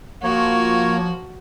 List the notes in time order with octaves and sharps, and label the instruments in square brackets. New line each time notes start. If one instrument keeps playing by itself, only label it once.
[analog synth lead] F3 [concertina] A#3 C#5 [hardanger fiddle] F#4